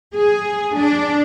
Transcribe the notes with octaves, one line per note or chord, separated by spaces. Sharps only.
G#4
D4